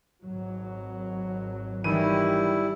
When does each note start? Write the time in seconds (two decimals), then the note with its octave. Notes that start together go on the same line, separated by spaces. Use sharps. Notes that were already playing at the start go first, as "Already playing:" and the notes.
0.23 G#1 F#3
1.84 D#3 E3 G3 E4 D#7